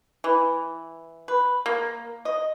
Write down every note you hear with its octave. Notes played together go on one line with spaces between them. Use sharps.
E3
B4
A#3
D#5